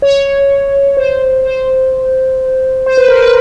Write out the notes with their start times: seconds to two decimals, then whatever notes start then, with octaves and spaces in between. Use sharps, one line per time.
0.02 C#5
0.97 C5
1.44 C5
2.86 C5
2.97 B4
3.09 A#4
3.20 B4